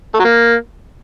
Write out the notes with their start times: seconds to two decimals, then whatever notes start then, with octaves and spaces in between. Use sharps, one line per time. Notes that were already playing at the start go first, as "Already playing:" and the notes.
0.14 A3
0.19 F#3
0.24 A#3